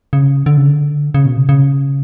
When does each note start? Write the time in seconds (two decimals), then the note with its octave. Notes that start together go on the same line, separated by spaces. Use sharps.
0.13 C#3
0.46 D3
0.57 C#3
0.67 D3
1.14 C#3
1.26 B2
1.37 C#3
1.49 C#3